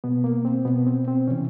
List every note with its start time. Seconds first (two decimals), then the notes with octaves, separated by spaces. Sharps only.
0.04 B2 B3
0.24 A#3
0.45 C4
0.65 B2 B3
0.87 C4
1.08 C4
1.28 C3 E3 C#4